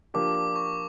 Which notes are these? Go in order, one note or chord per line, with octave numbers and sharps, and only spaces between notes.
F3 A#3 D4 G4 D6
D6
C#6